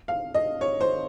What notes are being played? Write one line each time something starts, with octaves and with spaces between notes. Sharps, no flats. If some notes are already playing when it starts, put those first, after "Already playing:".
F5
D#5
C#5
C5